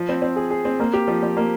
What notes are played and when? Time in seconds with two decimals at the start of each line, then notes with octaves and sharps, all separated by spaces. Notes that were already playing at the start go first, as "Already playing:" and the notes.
Already playing: F3
0.09 C4
0.22 C4
0.36 G#4
0.50 G#4
0.65 C4
0.80 A#3
0.93 G4
1.08 F3
1.23 F3
1.37 A#3